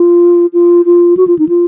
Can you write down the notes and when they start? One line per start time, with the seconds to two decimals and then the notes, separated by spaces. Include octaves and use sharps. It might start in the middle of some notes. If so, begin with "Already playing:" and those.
Already playing: F4
0.53 F4
0.85 F4
1.17 F#4
1.27 F4
1.39 D#4
1.49 F4